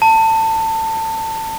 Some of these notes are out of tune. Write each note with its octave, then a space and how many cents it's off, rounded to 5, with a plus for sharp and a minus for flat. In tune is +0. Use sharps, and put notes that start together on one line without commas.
A5 +25